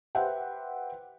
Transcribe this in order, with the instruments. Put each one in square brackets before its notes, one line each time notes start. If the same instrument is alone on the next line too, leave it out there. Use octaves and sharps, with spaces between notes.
[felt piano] G4 B4 C5 E5 F#5 G5